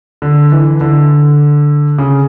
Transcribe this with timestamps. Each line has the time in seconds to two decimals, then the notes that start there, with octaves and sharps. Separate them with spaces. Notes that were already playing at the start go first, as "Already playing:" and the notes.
0.22 D3
0.52 E3
0.81 D3
1.98 C#3